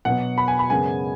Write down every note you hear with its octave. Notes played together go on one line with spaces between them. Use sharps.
B2 F#3 B3 F#5
B5
G#5
B5
F#2 C#3 G#3 B3 G#5